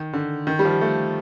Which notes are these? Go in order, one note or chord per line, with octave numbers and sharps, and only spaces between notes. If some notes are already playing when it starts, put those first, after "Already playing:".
Already playing: D#3
D3
D#3
G3
F3
A3